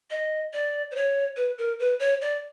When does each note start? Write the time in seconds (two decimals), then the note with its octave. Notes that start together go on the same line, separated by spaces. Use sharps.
0.11 D#5
0.53 D5
0.91 C5
0.96 C#5
1.36 B4
1.58 A#4
1.80 B4
2.00 C#5
2.21 D5